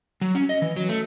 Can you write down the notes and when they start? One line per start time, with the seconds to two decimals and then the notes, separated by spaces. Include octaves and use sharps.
0.21 F#3
0.35 C#4
0.49 D#5
0.62 E3
0.76 F#3
0.89 A3